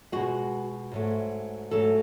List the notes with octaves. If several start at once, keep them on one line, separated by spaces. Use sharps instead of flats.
B2 G#3 F#4
G#2 F#3 A3
G#2 F#3 A3 A4